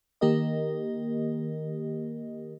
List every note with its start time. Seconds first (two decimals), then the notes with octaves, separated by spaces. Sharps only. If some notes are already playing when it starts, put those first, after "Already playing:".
0.21 D#3 A#3 G4 A#4 D#5